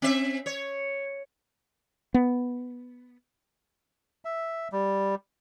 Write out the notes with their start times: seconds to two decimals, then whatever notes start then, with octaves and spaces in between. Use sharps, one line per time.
0.02 C4 E5
0.46 C#5
2.14 B3
4.25 E5
4.72 G3